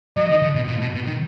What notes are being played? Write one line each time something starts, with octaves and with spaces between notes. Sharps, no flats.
F#3 D#5
D#3
D3
B2
A#2
B2
B2
D#3